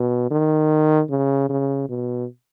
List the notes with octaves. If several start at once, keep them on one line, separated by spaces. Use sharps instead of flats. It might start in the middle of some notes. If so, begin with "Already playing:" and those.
Already playing: B2
D#3
C#3
C#3
B2